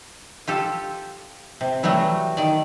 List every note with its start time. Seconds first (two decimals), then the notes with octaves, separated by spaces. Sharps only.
0.47 F4 G4 A4
1.61 C3
1.83 E3 F#3 G3 A3 F#4
2.37 D#3 D5